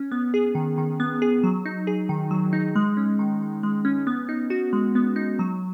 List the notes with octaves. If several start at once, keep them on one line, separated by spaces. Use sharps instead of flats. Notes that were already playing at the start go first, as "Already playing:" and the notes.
Already playing: C#4
B3
G#4
D#3
D#3
B3
G#4
F#3
D#4
G#4
D#3
F#3
D#4
G#3
C#4
D#3
D#3
G#3
C#4
B3
D#4
F#4
G#3
B3
D#4
F#3